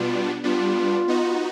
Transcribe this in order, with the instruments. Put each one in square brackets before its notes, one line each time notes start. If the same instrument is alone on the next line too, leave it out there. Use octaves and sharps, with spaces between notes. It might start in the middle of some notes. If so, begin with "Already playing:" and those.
Already playing: [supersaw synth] B2 G3 B3 D4 [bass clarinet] F4
[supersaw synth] G3 B3 D4 [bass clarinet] F4
[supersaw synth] B3 D#4 F#4